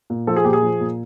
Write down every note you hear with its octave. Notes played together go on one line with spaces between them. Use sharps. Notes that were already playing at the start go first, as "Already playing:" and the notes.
A#2
F3 A4
G#4
A#2 G4
G#4
F3
A#2